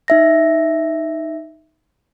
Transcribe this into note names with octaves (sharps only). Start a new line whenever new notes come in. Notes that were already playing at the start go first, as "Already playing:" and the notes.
D#4 E5 A#6